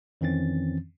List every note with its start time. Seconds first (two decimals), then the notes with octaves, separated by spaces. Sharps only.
0.21 F2 D#3 E3 C4 C#4 A6